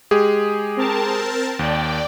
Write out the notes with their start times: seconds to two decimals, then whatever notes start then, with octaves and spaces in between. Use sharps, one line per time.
0.11 G#3 G4 G#4
0.77 C4 A#4 A5
1.59 D#2 D5 G5